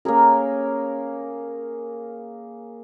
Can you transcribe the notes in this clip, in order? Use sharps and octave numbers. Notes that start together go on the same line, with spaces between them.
A#3 C#4 G#4 A#4